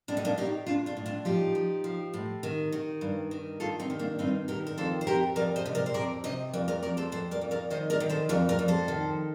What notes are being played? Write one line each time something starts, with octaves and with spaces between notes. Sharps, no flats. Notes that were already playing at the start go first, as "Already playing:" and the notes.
A2 D4
D#4
A#3 D4
A2 D#4 G4
A2 D4 F4
D4 F4
A2
D4 F4
F3 D#4 G4
F3
F3
A2
D#3
D#3
G2
D#3
G2 F4 A4
C4 D#4
D#3
A#3 D4
G2 C4 D#4
D#3 G4 A#4
A#4
F2 A4 C5
C5
F2 G4 A#4
F2 A#4 D5
C5 D#5
C3
A#4 D5
C5
F2 A#4 D5
C3 C5 D#5
F2 A#4 D5
A#4 D5
F2 A#4 D5
A4 C5
F2 A4 C5
A#4 D5
F2
A#4 D5
D#3 C5 D#5
A#4 D5
D#3
A4 C5
F2 A#4 D5
A#4 D5
F2
A4 C5
D#3